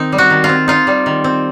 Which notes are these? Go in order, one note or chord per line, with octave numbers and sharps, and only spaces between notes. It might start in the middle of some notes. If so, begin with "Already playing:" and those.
Already playing: D#3 C4 D#4
G3
F#4
D#3
F4
C4
D#4 F4
G3
D#3
C4